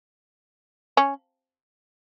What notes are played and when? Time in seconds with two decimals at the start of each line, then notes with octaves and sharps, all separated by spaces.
0.97 C#4